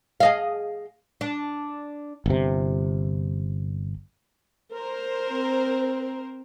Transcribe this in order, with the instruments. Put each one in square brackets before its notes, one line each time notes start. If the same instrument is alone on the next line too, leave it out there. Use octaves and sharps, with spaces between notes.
[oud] G#4 D#5 F5
D4
[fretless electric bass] G1 C3
[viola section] A#4 C5
[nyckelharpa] C4